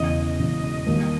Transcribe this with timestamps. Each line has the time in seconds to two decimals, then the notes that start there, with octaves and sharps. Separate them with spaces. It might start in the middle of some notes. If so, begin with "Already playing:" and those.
Already playing: E1 E2 C#3 D#5
0.39 E1 E2 C#3
0.87 D#2 D#3 G3